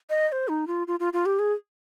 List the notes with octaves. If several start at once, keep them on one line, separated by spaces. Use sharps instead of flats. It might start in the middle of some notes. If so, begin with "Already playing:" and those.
D#5
D#5
C5
D#4
F4
F4
F4
F4
G4
G#4